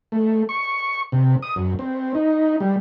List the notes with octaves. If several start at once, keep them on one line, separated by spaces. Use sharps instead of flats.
A3
C#6
C3
D#6
F#2
C4
D#4
G3